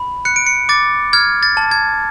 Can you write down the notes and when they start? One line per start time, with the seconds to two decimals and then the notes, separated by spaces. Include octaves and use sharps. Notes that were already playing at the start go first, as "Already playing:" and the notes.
Already playing: B5
0.25 F#6 C#7
0.36 D7
0.46 C#7
0.69 D6 A6
1.13 F6 G#6
1.43 A6
1.57 A5
1.71 G#6